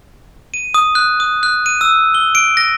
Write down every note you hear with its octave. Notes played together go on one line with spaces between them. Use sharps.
D#7
D#6
F#6
D#6
F#6
D#7
E6
G7
D7
A#6